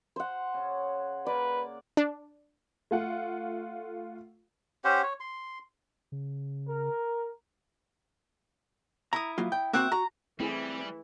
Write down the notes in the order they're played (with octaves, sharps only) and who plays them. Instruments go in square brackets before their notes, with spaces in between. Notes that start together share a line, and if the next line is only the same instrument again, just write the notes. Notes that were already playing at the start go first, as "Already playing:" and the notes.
[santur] C5 F#5
[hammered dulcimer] C#3 C#4
[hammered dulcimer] A#3 [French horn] B4 [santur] D5
[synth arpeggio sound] D4
[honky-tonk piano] A3 F4 F#5
[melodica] C#4 G4 C5 F#5
C#5
C6
[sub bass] C#3
[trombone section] A#4
[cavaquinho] E4 D#6 [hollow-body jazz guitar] A#5
[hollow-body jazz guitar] F#3 A#3 F4
G5
[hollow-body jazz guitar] A#3 C4 F#4 [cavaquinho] E5 F#5 G5
[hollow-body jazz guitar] F#4 [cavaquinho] A#5
[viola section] E3 [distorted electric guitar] G3 [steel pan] A3 E4 G#4 [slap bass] C4